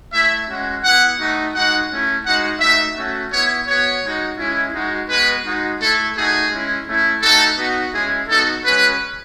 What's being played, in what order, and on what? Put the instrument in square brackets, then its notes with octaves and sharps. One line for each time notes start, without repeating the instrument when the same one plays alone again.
[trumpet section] A3 E4 E5
G#3 C#4 F#4
B3 E4 F#5
A3 D#4 F#4
G#3 D#4 F#4 F#5
A3 C#4 E4
G#3 D#4 F#4 F#5
A3 D#4 F#4 E5
A3 C#4 F#4
B3 E4 C#5
B3 F#4 C#5
G#3 D#4 F#4
G#3 C#4 E4
G#3 D#4 F#4
G#3 B3 F#4 B4
G#3 D#4 F#4
A3 E4 A4
A3 D#4 F#4 G#4
G#3 C#4 E4
A3 C#4 E4
A3 D#4 F#4 A4
B3 D#4 F#4
G#3 C#4 E4 G#4
B3 D#4 F#4 A4
G#3 C#4 F#4 B4